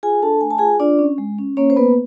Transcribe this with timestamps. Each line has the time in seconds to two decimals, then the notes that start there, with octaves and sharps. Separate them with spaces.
0.03 F4 G#4 G#5
0.22 D4 A4 A5
0.41 A3 G#5
0.50 A5
0.58 F4 G#4 G#5
0.80 D4 F4 D5
0.99 C#4
1.18 G#3
1.39 C#4
1.57 A#3 C#4 C#5
1.70 C5
1.76 A#3 B3 B4